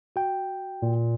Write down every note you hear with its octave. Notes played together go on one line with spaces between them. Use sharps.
F#4 G5
A#2